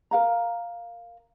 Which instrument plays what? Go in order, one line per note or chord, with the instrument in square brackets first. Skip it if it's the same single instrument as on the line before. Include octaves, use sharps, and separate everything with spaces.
[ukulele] A#4 F5 A#5